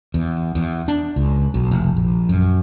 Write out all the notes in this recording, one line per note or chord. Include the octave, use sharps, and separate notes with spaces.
E2
E2
D4
C#2
B1
F1
A#1
F#2